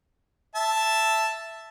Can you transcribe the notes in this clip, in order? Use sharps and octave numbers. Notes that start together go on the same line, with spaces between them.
E5 A5